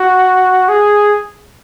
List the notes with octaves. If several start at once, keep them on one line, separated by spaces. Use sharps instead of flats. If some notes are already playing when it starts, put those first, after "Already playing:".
Already playing: F#4
G#4